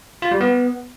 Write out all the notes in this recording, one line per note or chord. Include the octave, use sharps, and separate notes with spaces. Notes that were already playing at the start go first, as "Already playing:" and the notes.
F4
G3
B3